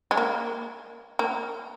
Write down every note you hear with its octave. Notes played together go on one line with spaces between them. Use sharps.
G#3
A#3
A#3